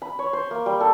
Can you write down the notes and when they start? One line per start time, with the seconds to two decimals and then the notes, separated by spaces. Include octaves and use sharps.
0.02 B5
0.19 C#5
0.33 C5
0.51 A#3
0.66 G3
0.80 A4